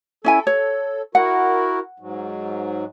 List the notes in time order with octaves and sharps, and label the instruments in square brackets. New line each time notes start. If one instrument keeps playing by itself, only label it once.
[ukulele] C#4 E4 G#5 [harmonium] A4
[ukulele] C#5
[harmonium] E4 F#4 A#4 [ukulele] F#5
[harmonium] G#2 F#3